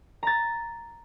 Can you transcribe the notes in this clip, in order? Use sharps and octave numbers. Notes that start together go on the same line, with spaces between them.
A#5 A6